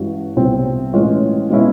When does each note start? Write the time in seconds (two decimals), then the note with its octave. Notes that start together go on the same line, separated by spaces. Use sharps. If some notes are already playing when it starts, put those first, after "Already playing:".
Already playing: G2 E3 G#3 C#4 F#4
0.36 C2 B2 G3 C4 F4
0.93 A2 E3 G#3 C#4 F4
1.50 B2 G#3 C#4 E4